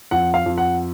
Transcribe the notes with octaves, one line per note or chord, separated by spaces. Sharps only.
F2 F#5
F5
F2
F#5